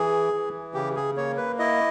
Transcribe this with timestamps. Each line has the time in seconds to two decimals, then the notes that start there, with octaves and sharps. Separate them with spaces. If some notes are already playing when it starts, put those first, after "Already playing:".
Already playing: E3 G#4
0.33 E3
0.74 C#3 G4
0.96 G#4
1.17 A#3 C#5
1.37 B4
1.59 E4 D#5